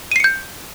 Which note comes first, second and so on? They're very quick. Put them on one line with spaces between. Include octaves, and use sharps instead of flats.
D#7 C7 C#7 G6